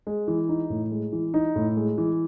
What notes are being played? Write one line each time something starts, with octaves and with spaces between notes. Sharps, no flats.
G#3
E3
D#4
A2
G#3
E3
D#4
A2
G#3
E3